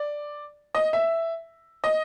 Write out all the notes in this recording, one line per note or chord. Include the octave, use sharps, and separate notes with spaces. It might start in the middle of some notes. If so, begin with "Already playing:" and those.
Already playing: D5
D#5
E5
D#5